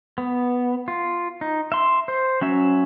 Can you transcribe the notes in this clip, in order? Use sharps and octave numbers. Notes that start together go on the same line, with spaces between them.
B3
F4
D#4
E5 C6
C5
F#3 C#4 E5